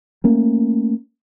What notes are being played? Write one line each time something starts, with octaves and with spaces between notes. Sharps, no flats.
A3 A#3 C#4